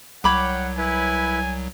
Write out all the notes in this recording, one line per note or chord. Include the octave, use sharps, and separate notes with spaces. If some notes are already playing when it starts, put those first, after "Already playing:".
C2 F#3 C#5 F#5 G5 B5 D6
E4 B4 G#5